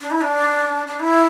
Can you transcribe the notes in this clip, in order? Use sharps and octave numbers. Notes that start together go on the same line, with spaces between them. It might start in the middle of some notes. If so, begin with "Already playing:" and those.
D4
E4
D4
D4
E4